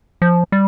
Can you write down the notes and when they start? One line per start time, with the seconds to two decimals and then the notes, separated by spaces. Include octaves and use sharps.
0.22 F3
0.52 G3